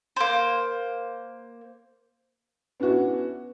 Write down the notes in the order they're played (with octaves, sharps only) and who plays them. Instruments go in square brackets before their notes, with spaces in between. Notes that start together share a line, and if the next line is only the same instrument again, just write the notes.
[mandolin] A#3 C5
[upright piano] B3 C#4 D4 E4 F#4